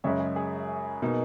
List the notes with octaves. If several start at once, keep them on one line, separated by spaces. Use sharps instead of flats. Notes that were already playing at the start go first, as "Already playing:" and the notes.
F#2 C#3 G#3 C#4 C#5 E5
G#4
G#4
B2 A#3 D#4